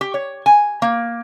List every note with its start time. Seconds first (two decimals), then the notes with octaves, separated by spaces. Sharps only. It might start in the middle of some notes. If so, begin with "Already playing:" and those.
0.01 G4
0.14 C#5
0.46 G#5
0.82 A#3